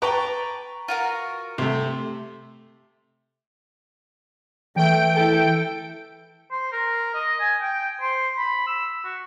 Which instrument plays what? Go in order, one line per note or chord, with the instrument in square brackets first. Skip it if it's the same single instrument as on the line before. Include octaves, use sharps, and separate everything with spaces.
[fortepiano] B4 A#5 C#6 [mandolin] G5 A5 D6
[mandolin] F4 F#4 A#4
[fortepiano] C3 A3 [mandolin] C5
[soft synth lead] E3 [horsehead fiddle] A3 [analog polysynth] G5 D7
[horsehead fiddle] E4 A4
[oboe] C5
A#4
D#5
G#5
G5
C5
B5
E6
F#4